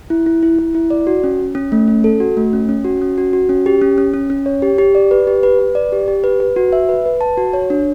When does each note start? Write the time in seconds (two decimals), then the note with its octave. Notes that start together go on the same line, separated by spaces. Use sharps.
0.10 E4
0.26 E4
0.43 E4
0.59 E4
0.75 E4
0.90 D5
1.07 F#4
1.24 C#4
1.39 C#4
1.55 C#4
1.72 A3
1.88 C#4
2.04 A4
2.20 F#4
2.37 A3
2.53 C#4
2.69 C#4
2.85 F#4
3.02 C#4
3.18 F#4
3.33 F#4
3.49 C#4
3.66 G4
3.82 C#4
3.98 C#4
4.14 C#4
4.30 C#4
4.46 C#5
4.62 G4
4.78 G4
4.95 D5
5.11 B4
5.27 G4
5.43 B4
5.59 B4
5.75 D5
5.92 G4
6.08 G4
6.24 B4
6.40 B4
6.56 F#4
6.73 E5
6.89 B4
7.06 B4
7.21 A5
7.37 F#4
7.53 C#5
7.70 D4